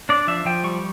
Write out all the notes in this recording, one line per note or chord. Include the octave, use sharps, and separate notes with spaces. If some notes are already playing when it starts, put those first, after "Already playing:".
D4 D5
F3 E5
F3 G5
G3 C#6